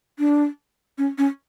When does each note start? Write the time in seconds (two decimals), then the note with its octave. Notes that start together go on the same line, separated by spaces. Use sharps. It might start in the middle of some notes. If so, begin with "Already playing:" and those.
0.19 D4
0.98 C#4
1.18 C#4